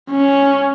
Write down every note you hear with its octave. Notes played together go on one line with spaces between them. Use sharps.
C#4